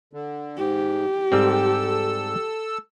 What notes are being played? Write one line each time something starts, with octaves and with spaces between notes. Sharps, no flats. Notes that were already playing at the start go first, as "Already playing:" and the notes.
D3
G#2 G4
G#2 G3 C4 A4 E6